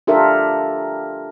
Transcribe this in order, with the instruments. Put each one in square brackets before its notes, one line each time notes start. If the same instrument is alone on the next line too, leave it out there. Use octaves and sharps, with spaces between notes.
[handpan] D4 F4 G4 A4 A#4 E5